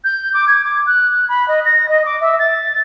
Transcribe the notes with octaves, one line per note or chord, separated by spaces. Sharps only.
G6
D6
G#6
D6
F#6
B5
D#5
A#6
D#5
D6
E5
A6